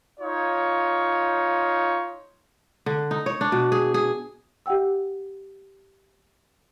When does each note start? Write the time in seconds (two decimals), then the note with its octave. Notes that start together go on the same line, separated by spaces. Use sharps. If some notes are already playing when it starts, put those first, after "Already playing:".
0.20 D#4 F4 C#5
2.86 D3
3.11 D#4
3.26 C#5
3.41 D4
3.52 B2
3.72 G#4
3.94 G#4
4.66 G4 E5 F#5 G5 E6